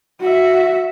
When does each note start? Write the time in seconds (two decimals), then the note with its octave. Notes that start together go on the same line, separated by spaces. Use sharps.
0.21 F#4 E5